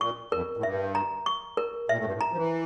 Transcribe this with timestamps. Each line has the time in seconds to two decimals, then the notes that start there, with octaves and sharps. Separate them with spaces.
0.01 A#2 C#6
0.32 F2 A#4
0.57 A2
0.63 G2 E5
0.95 A#5
1.26 C#6
1.57 A#4
1.89 A#2 E5
1.97 A2
2.05 G2
2.13 A2
2.21 A#5
2.32 F3
2.36 E3